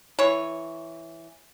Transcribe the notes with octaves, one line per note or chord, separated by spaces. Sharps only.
E3 C#5